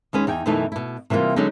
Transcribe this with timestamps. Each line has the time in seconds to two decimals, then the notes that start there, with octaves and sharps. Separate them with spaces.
0.13 D#2 G#3 C#4 B4
0.27 E2 D#4 G5 G#5
0.46 F#2 B2 E3 A3 D#4 E4
0.72 B2 E4
1.10 C3 E3 G3 A#3 F4
1.36 D3 F#3 G#3 C#4 D#4